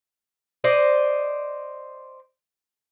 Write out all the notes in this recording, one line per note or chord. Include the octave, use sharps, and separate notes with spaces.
C5 D5 D#5